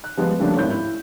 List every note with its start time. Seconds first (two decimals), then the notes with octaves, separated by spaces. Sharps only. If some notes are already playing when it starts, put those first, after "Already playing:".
0.04 F#6
0.17 F3 G3 G#3 B3
0.39 C#3 F3 G3 A3 A#3 D4
0.57 G#1 D#2 A2 G6
0.71 E4